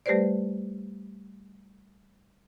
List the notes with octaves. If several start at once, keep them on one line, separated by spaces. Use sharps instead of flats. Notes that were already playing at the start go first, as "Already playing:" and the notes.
G3 A3 G4 B4 C5 D5